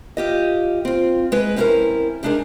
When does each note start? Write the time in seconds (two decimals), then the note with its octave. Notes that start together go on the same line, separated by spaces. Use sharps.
0.17 F4 G4 D#5
0.85 C4 F4
1.32 G#3 B4
1.56 C4 C#4 E4 G4 A4 A#4
2.23 G3 G#3 D4 D#4 G#4 A#4